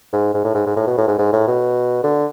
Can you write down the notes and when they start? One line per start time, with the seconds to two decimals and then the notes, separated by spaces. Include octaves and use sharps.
0.13 G#2
0.34 G#2
0.44 A2
0.55 G#2
0.66 G#2
0.77 A2
0.87 B2
0.98 A2
1.08 G#2
1.18 G#2
1.33 A2
1.47 B2
2.04 D3